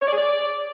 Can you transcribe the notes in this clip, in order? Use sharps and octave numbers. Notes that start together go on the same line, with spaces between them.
C#5
D5
G#4
D5